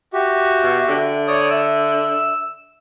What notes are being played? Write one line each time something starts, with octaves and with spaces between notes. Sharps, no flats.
F#4 G4 E5
B2
D3
C#5 D5 D#6
E5 E6